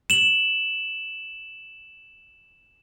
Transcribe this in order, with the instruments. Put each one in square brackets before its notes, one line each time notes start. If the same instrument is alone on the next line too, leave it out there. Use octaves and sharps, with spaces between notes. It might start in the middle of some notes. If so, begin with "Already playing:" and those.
[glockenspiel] E7 F#7